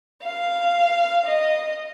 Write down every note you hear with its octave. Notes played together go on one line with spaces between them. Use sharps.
F5
D#5